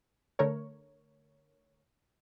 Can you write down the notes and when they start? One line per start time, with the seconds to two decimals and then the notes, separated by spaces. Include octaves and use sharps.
0.39 D3 A3 A#4 C#5